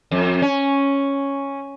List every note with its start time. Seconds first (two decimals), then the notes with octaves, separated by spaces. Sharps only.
0.11 F2
0.42 C#4